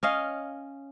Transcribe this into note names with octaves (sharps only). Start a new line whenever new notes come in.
C#4 D#5 F5